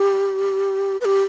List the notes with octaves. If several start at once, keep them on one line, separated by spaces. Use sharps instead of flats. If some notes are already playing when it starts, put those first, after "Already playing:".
Already playing: G4
B4
G4